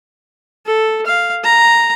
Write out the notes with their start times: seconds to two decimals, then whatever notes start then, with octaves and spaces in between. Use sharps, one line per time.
0.66 A4
1.06 F5
1.44 A#5